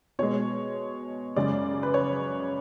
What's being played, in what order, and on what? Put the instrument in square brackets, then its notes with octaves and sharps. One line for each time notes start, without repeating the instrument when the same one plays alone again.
[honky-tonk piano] B2 G#3 C#5
F#2 C#3 G#3 D5
B4
C#5